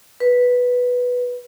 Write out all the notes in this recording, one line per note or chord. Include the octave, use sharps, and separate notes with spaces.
B4